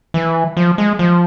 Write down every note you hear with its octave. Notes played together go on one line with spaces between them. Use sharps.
E3
F3
G#3
F3